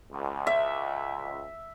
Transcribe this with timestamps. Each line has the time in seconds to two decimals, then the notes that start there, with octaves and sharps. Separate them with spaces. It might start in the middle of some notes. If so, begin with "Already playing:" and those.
0.12 C#2
0.47 E5